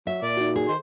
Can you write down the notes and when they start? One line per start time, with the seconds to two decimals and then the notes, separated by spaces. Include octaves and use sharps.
0.07 F#3 E5
0.22 A#2 D5
0.37 D#4 F#4
0.56 G#4
0.69 D#3 C5